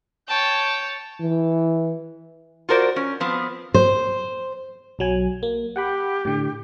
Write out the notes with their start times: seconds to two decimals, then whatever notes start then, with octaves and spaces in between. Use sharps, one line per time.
0.28 C#5 G5 A5
1.20 E3
2.69 F4 F#4 A#4 C5 D5
2.96 C#4
3.20 F3 B3 C4
3.74 C5
4.99 B1 F#3 G#5
5.43 A#3
5.76 G4 F#5 G5 B5
6.25 A2 D3